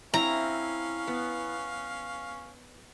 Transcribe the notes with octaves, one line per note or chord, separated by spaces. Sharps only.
C4 C#4 E4 F5 A#5
B3